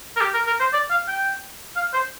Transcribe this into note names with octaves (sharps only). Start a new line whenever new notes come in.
A#4
G4
A#4
A#4
C5
D5
F5
G5
F5
C5